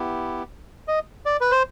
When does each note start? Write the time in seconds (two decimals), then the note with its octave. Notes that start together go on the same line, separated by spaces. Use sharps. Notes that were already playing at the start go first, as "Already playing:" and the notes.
Already playing: B3 E4 G4
0.88 D#5
1.26 D5
1.41 B4
1.51 C5